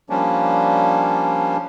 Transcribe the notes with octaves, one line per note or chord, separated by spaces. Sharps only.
F3 G3 A#3 C#4 D4